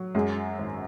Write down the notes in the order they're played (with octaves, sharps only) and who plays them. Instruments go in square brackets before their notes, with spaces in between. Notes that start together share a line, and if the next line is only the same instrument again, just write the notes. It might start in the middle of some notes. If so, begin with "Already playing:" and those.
Already playing: [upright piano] F#3
[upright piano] F#2 [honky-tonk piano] G#3
[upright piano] G#1